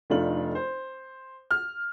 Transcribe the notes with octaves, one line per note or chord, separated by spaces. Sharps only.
F1 A3 D4 D#4 F4 F#7
C5
F6